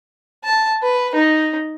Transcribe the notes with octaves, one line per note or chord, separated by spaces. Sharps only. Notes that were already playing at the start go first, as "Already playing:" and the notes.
A5
B4
D#4